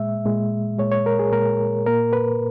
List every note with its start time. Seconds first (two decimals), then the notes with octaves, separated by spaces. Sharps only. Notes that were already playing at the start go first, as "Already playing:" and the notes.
Already playing: A#2 G#3 E5
0.25 A#2 G#3
0.78 A#2 G#3 C#5
0.92 C#5
1.06 A#4
1.19 G#4
1.32 A#2 G#3 A#4
1.87 A#2 A#3 A#4
2.13 B4